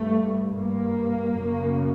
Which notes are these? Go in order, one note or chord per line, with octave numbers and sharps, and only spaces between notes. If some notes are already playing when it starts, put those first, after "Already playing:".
Already playing: G2 A3
G2 A#3
F#2 C#3